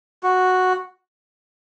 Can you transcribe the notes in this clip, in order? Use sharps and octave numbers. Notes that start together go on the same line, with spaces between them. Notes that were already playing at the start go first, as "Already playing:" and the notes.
F#4